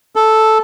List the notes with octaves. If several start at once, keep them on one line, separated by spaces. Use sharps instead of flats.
A4